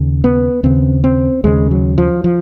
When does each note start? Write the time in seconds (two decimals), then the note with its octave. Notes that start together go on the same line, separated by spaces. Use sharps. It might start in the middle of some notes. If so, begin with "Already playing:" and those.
Already playing: D#2 C#3
0.24 B3
0.63 D#2 C#3 C4
1.04 C4
1.44 D#2 C#3 G#3
1.71 F#3
1.98 F3
2.24 F3